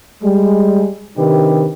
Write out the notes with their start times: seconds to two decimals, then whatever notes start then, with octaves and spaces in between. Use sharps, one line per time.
0.23 G3 G#3
1.17 C3 D#3 D4 G4 B4